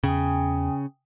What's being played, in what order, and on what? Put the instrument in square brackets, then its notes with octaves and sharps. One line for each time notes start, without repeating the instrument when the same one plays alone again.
[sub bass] E2 [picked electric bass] C#3 [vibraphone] G5 G#5 D#6